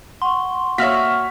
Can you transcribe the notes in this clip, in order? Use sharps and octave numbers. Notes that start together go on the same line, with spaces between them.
F#5 C6 C#6
A#3 F#4 C#5 E5 F6 B6